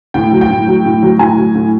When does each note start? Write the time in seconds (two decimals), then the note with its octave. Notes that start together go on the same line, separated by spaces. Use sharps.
0.14 A2 G5
0.32 F#3
0.41 G5
0.50 A2
0.67 F#3
0.85 A2
1.03 F#3
1.19 A2 G#5
1.37 F#3
1.55 A2